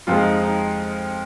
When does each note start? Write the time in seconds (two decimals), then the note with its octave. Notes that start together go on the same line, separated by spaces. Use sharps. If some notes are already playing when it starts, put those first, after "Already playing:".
0.07 F2 F3 G#3 F4
0.19 D#4
0.41 D#4